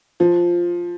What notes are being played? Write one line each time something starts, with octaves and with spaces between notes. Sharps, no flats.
F3